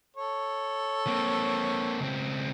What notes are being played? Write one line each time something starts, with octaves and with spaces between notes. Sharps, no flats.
A4 C#5
A#3 C4
C#2 C4